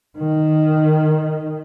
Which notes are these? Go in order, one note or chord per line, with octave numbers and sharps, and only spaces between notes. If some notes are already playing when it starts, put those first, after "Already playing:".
D#3